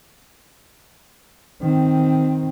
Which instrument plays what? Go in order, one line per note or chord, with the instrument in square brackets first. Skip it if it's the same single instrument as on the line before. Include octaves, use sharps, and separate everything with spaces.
[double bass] D#3 C4